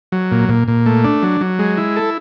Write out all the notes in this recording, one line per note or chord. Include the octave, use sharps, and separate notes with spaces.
F#3
A#2
A#2
A#2
A3
D4
F#3
F#3
G#3
E4
A4